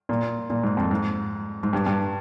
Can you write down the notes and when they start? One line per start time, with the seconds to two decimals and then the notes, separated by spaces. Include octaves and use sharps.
0.09 A#2
0.50 A#2
0.63 G#2
0.77 F2
0.91 G#2
1.63 G#2
1.73 G2
1.86 G2